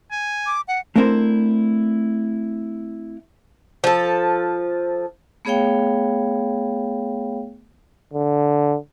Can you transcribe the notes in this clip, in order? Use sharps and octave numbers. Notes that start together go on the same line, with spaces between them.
G#5
D6
F#5
A3 C4 D4 E4 A#4 C5
F3 A4
A3 B3 G#4 C#5 F5 G5
D3